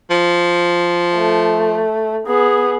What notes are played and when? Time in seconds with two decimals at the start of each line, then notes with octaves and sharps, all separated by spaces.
0.10 F3
1.15 A3
2.27 B3 G#4